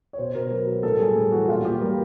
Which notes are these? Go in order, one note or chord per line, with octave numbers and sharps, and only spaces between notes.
C#5
B2 C5
B2 A#4
F#3 B4
F#3
A#4
A2 A4
G3 G#4
A2
E3 F#4
A#2 F4
A#2 G4
G3 A#4